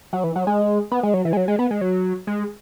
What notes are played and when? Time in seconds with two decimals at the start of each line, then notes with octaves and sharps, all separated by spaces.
0.13 F#3
0.24 E3
0.36 F#3
0.47 G#3
0.92 B3
1.03 G#3
1.14 F#3
1.25 E3
1.33 G#3
1.37 F#3
1.48 G#3
1.59 B3
1.71 G#3
1.81 F#3
2.27 G#3